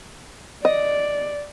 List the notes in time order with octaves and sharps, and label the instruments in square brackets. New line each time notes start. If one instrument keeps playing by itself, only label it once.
[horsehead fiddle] D5 [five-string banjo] D#5